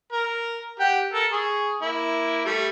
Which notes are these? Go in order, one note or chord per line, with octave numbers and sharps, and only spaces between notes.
A#4
G4 F#5 G5
A4 A#4
G#4 C#6
A#3 E4
G3 A3